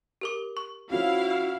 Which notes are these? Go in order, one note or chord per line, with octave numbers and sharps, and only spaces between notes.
G4 A#4 D6
C#6
F3 C#4 E4 F#4 F5